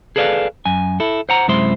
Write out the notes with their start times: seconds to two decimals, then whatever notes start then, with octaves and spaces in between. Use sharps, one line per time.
0.16 G#4 A4 B4 D5 D#5 F5
0.66 F#2 G#5
1.00 E4 A4
1.29 C5 F#5 A#5
1.48 F#2 C3 G#3 E4 C5 C6